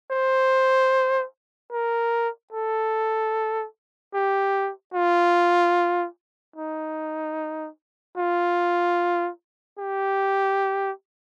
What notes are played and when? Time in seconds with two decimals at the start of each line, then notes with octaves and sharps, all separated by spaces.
0.11 C5
1.72 A#4
2.53 A4
4.14 G4
4.94 F4
6.56 D#4
8.17 F4
9.79 G4